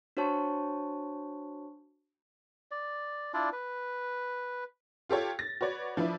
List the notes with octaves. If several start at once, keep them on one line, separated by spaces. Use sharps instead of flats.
D4 F#4 C5 C#5 A5 C#6
D5
D4 E4 F4 D5
B4
F4 G4 A4 C#5
A6 A#6
F#4 B4 C#5 D5
F3 D4 E4 B4